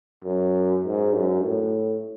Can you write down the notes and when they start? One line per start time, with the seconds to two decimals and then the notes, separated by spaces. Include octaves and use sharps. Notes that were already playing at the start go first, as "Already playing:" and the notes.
0.24 F#2
0.85 G#2
1.15 F#2
1.45 A2